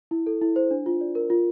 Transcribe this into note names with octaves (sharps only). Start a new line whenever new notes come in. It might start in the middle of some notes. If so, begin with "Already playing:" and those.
E4
A4
E4
C5
D4
F4
D5
A#4
F4